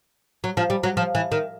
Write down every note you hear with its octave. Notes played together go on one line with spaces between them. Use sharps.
F#3
F3
G3
F#3
F3
E3
D#3